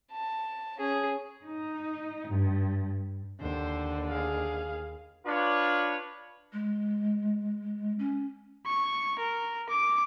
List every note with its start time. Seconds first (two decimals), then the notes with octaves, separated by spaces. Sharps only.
0.12 A5
0.78 C#4 G#4
1.45 D#4
2.28 G2
3.41 D#2 D3 C5
4.09 G#4 F5
5.26 D4 F4 B4 C#5 D5
6.53 G#3
7.99 C#4
8.66 C#6
9.19 A#4
9.70 D6